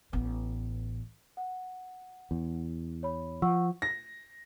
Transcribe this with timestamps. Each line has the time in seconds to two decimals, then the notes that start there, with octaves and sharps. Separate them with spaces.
0.13 A1 B3
1.37 F#5
2.31 E2
3.03 C#5 B5
3.42 F3 F#5 C#6 E6
3.82 A#6